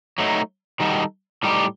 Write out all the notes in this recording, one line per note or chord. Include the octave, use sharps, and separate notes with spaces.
F#3 A3 D#4
D#3 G3 D#4 F#4 A4
A2 G3 D#4 G4